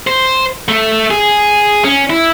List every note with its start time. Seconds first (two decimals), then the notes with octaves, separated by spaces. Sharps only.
0.07 C5
0.68 A3
1.11 G#4
1.84 C#4
2.10 E4